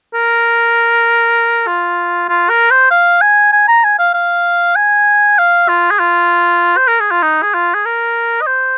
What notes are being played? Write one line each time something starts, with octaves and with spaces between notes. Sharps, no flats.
A#4
F4
F4
A#4
C5
F5
G#5
G#5
A#5
G#5
F5
F5
G#5
F5
F4
G#4
F4
C5
A#4
G#4
F4
D#4
G#4
F4
G#4
A#4
D#5
C5